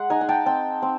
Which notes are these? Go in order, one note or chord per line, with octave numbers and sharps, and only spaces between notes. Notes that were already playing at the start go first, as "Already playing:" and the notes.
Already playing: G#3 F#5
D#4 G#5 A#5
G#5
G5 A5
C4 G5 A5
C4